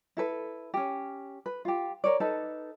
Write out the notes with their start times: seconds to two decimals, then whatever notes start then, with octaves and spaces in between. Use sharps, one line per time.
0.17 E4 A4 B4
0.74 C#4 G4
1.46 B4
1.65 F4 G4
2.04 A#4 C#5 D5
2.20 D#4 A4 B4 A5